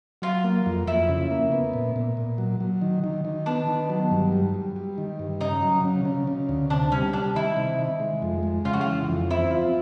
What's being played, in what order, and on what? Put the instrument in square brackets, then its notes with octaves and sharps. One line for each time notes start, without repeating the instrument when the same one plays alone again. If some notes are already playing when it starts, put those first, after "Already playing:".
[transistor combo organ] F#3 [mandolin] F4
[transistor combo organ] A#3
F2
[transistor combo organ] F2 [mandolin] E4
[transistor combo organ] C#3
A#3
B3
A#2
A#2
A#2
F#3
F#3
D#3
D#3
D#3
[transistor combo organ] B3 [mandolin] D4
[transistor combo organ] D#3
F#3
G2
G3
G3
G3
D#3
G2
[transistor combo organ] C#3 [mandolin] D#4
[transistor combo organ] F#3
C#3
C#3
C#3
D2
[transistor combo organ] C3 [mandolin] D4
[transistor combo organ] G3 [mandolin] C#4
[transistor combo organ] G3 [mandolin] D4
[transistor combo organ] D#3 [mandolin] E4
[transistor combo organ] C3
D#3
G#3
F2
G#3
[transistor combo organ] C#3 [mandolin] F4
[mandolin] F#4
F4
[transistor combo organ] E3
F2
[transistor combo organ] C4 [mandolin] E4
[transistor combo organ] F4